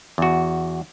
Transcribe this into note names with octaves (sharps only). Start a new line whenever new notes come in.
E2 F#4